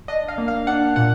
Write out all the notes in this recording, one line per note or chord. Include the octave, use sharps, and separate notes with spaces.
D4 D#5
F5
A#3
F5
D4 F#5
A#2 F#5